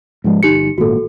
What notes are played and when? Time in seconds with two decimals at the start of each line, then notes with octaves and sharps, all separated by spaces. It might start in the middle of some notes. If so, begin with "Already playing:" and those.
0.24 G#2 F3 G#3
0.43 G1 D#4 G4 C#7
0.78 G#1 A#2 F#4 A4